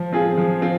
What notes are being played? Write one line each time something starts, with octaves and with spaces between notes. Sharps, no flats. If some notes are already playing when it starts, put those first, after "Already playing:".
Already playing: F3
C4 F4 G#4
F3
C4 F4